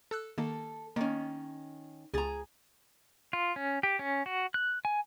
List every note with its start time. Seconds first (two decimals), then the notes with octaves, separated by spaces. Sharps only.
0.11 A4 E6 F#6
0.38 D#3 A#3 A4
0.96 D#3 A#3 C#4
2.14 C#2 G#4 A#5 A6
3.33 F4
3.56 C#4
3.83 G4
3.99 C#4
4.26 F#4
4.54 F#6
4.85 G#5